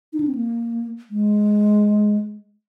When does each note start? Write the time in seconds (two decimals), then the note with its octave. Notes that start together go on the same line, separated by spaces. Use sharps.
0.13 D#4
0.20 D4
0.27 C4
0.35 A#3
1.11 G#3